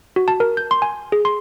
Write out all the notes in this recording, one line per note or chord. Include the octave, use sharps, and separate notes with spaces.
F#4
A5
A#4
G6
C6
G#5
G#4
C6